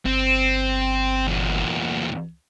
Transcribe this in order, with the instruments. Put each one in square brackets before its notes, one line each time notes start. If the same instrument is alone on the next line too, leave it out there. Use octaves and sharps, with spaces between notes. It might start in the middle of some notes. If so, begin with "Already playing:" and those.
[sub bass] G1 [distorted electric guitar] C4
[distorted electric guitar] E2 A#2